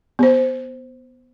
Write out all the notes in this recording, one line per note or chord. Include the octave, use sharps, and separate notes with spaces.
B3 C5